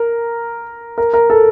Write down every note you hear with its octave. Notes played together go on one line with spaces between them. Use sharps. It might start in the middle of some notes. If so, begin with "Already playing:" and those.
Already playing: A#4
A#4
A#4
A4